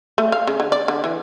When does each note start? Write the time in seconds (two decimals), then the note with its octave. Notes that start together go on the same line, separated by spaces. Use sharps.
0.18 A3
0.32 F5
0.47 C#3
0.60 D3
0.72 D5
0.88 D3
1.04 E3